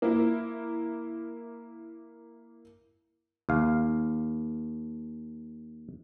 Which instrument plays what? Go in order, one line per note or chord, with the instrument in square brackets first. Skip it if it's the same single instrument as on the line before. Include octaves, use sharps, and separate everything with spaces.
[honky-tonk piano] A#3 E4
[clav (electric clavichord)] D#2 F5